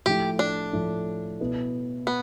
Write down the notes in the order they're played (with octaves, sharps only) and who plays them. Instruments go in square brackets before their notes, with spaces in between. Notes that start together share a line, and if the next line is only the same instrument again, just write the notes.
[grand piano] A2 F3 A3 E4 [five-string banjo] G4
[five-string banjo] D4
[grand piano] A2 F3 A3 E4
B2 B3 E4
[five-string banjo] B3